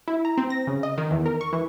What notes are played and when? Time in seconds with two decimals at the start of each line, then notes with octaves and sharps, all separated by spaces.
0.08 E4
0.25 A#5
0.37 C4
0.50 A#6
0.67 C#3
0.83 D#5
0.98 D#3
1.11 E2
1.26 A#4
1.41 C#6
1.53 E3